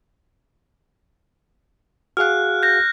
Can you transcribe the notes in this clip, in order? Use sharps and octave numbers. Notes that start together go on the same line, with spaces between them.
F#4 G#4 F5 F6 F#6
G6 A#6